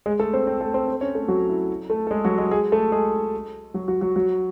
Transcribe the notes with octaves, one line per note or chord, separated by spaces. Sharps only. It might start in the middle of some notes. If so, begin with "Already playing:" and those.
G#3 G#4
A3 A4
C4 C5
C4 C5
A3 A4
C4 C5
C4 C5
C#4 C#5
A3 A4
F#3 F#4
E4
A3 A4
A4
G#3 G#4
F#3 F#4
G#3 G#4
G#3 G#4
A3 A4
G#3 G#4
F#3 F#4
F#3 F#4
F#3 F#4
F#3 F#4